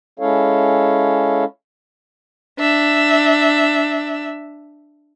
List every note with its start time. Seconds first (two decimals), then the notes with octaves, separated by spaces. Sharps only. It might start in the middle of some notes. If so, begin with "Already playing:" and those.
0.19 G#3 C#4 E4 A4 C#5 F5
2.59 D4 E5